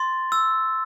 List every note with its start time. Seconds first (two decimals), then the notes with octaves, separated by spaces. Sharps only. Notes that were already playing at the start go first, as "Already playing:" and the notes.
Already playing: C6 A6
0.32 E6